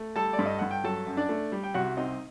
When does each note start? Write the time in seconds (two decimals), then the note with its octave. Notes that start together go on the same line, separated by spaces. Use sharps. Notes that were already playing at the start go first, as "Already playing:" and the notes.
Already playing: A3
0.16 G3 A4 A5
0.33 D5
0.39 G2
0.46 D#5
0.59 G2 F#5
0.71 G5
0.84 F#3 A4 A5
1.07 F#2
1.17 D4 D5
1.29 A3
1.52 G3
1.63 G5
1.74 C2 F#4 F#5
1.97 C4 D#4 D#5